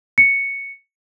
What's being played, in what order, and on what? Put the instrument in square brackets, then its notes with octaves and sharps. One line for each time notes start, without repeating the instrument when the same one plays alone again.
[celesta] C#7